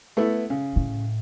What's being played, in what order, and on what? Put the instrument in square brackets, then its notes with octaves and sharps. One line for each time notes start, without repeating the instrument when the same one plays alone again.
[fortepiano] A3 B3 E4
C#3
[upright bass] A2